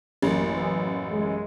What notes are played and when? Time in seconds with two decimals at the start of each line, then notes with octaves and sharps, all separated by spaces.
0.22 A1 F#2 A#3
0.56 E3 B3 E5
1.11 G#3